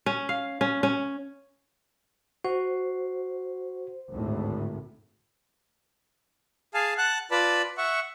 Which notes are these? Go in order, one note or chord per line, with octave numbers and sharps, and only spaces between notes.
C#4
F5
C#4
C#4
F#4 C5
G#1 D2 A2
G#4 F5 G#5 A5
F#5 A5 F#6
F4 B4 D5 A5 B5
E5 F#5 C#6